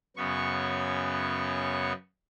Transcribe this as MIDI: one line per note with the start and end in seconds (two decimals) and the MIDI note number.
0.17 1.93 42
0.17 1.93 49
0.17 1.93 59
0.17 1.93 85